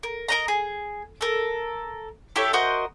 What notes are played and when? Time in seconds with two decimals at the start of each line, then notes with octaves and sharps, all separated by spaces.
0.03 A#4
0.28 A#4 D#5 A#5
0.48 G#4
1.21 A4 A#4
2.36 E4 G4 A4 C#5
2.53 F#4 A#4 C5 D#5